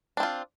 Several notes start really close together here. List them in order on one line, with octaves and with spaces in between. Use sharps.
D4 C4 F4